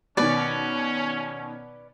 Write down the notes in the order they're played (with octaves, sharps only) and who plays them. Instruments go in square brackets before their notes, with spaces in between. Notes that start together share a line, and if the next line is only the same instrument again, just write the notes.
[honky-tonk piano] B2 D#3 [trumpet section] C#4 [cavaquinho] B4 D5